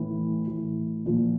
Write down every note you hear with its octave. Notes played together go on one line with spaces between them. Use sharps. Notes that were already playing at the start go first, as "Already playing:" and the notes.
Already playing: A2 E3
A2 E3
A#2 F3